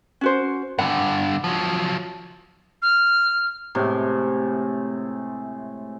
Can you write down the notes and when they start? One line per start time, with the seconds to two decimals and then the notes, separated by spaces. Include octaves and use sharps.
0.21 C#4 F#4 C5
0.78 G2 D3 F#5
1.44 F3 F#3
2.82 F6
3.75 A2 C3 G#3